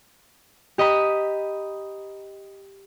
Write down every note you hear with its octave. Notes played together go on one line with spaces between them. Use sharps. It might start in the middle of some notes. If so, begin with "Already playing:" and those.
G4 D#5 A#5 B5